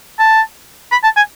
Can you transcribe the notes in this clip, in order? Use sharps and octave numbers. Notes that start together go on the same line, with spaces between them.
A5
B5
A5
G#5